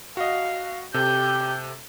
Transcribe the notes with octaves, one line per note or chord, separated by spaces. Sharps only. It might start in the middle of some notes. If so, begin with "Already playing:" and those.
F#4 D#5 F5
C3 G4 A4 G6